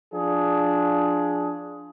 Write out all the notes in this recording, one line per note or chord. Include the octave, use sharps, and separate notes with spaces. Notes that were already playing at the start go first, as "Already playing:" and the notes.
F3 D4 G#4